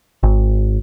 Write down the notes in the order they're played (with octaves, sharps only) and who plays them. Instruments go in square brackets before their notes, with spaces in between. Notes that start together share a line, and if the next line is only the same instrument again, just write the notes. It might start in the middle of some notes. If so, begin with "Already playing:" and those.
[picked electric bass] G#1